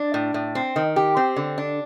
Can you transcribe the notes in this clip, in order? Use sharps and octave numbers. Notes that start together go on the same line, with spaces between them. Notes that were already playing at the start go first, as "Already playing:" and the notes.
Already playing: D4
A2
A2
C4
D#3
G4
C4
D3
D4